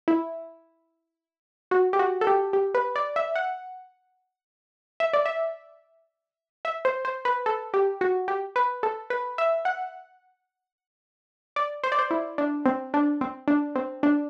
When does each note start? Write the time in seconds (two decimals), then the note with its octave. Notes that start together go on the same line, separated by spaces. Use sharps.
0.08 E4
1.71 F#4
1.93 G4
1.99 F#4
2.21 A4
2.27 G4
2.53 G4
2.75 B4
2.96 D5
3.16 E5
3.36 F#5
5.00 E5
5.13 D5
5.26 E5
6.65 E5
6.85 C5
7.05 C5
7.25 B4
7.46 A4
7.74 G4
8.01 F#4
8.28 G4
8.56 B4
8.83 A4
9.10 B4
9.38 E5
9.65 F#5
11.56 D5
11.84 C5
11.92 D5
11.99 C5
12.11 E4
12.38 D4
12.66 C4
12.94 D4
13.21 C4
13.48 D4
13.76 C4
14.03 D4